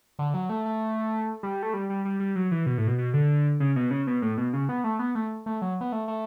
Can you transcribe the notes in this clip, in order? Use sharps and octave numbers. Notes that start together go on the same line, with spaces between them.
D3
F#3
A3
A3
G3
A3
G3
G3
G3
G3
F#3
E3
B2
A2
B2
B2
D3
C#3
B2
C#3
B2
A2
B2
C#3
B3
A3
B3
A3
A3
F#3
B3
A3
A3